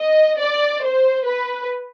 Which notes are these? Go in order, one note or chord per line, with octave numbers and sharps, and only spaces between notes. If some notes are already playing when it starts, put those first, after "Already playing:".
Already playing: D#5
D5
C5
B4